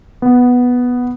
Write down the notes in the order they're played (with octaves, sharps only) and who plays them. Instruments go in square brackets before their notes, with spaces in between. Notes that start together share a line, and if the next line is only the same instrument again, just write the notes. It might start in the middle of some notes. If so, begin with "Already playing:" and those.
[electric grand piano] B3